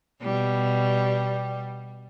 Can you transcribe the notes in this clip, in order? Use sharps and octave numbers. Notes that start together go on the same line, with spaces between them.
B2 G3